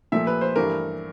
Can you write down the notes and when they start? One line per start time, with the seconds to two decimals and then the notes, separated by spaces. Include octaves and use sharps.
0.12 A#2 F3 A3 E5
0.27 B4
0.41 C5
0.56 G2 E3 A3 A#4